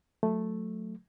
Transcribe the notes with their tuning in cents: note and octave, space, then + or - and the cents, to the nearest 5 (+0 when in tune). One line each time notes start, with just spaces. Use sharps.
F#3 -20 A3 +0